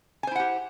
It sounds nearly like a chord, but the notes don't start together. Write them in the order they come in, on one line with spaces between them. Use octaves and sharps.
G#5 C5 E4 F#5 G4